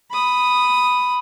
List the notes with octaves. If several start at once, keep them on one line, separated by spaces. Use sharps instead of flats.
B5 D#6